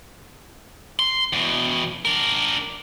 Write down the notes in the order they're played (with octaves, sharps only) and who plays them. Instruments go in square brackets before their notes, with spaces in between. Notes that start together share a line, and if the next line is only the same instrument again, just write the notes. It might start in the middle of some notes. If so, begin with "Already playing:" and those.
[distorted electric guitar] C6
E2 B2
D4 A#4